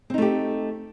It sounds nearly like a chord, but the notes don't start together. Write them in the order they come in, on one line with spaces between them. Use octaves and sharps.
C4 D#4 A3 G4